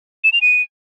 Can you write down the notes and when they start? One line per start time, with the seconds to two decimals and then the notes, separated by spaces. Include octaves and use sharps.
0.24 E7
0.33 F7
0.41 D#7